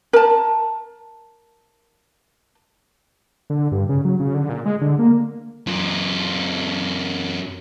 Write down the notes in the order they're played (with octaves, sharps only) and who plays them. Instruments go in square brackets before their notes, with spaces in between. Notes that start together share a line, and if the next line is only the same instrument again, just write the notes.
[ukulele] A#4 A5
[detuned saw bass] D3
G2
C#3
F#3
C#3
D3
A#2
G#3
D3
A#3
[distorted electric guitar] F#2 F4